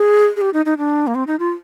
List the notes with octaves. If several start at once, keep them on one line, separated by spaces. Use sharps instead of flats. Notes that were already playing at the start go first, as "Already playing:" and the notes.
Already playing: G#4
G#4
G4
D#4
D#4
D4
A#3
C4
D#4
F4